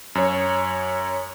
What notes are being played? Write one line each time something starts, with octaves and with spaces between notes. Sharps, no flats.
F#2 C#5